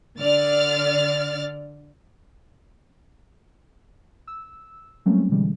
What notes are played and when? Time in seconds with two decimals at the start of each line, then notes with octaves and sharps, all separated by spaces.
0.20 D3 D5 F6 A6
4.27 E6
5.06 F#3 G3 A3 A#3 C4 C#4
5.29 B2 D3 E3 G3 G#3